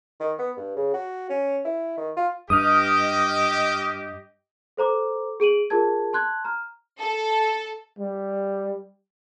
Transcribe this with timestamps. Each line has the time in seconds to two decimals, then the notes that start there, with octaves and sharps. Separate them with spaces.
0.20 D#3
0.39 B3
0.57 G2
0.76 C#3
0.94 F#4
1.30 C#4
1.65 E4
1.98 D#3
2.17 F4
2.50 G2 G4 D#5 D#6 F6
4.77 A4 C5 A#5 D6
5.40 G#4 D7 D#7 F#7
5.70 F4 G#4 A#4 A5 G#6
6.13 A5 C6 F#6 G#6
6.45 A#5 F6
7.01 A4
7.99 G3